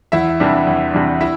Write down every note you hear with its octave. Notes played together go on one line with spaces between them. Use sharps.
E2 E4 E5
C3 E3 G3 D4
E2
C3 E3 G3 D4
E4 E5